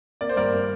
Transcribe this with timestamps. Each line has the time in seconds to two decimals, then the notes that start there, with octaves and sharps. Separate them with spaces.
0.21 A#3 D5
0.29 C5
0.36 G2 A#4 D5
0.53 A#3